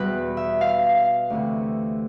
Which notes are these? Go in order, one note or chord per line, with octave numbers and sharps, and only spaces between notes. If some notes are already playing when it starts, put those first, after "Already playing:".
Already playing: E2 B2 G3 B4
E5
F5
D2 C3 E3